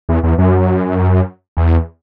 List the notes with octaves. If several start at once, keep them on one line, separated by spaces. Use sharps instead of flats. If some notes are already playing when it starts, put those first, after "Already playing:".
E2
E2
F#2
E2